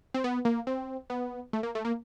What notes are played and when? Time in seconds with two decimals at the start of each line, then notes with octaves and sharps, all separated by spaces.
0.14 C4
0.24 B3
0.45 A#3
0.67 C4
1.10 B3
1.53 A3
1.63 A#3
1.75 A3
1.85 A#3